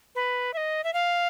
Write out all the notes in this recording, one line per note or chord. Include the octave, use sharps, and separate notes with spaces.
B4
E5
D#5
E5
F5